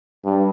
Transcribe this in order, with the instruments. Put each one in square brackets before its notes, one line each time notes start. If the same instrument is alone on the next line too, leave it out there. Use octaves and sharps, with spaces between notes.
[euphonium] G2